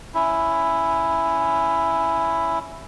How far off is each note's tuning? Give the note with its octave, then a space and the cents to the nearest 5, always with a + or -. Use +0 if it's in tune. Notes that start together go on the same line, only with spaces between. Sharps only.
C#4 +0 E4 +5